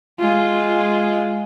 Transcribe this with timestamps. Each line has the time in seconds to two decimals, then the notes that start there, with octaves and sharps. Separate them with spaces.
0.19 G#3 F4